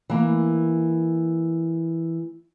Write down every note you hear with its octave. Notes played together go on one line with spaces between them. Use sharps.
E3 A#3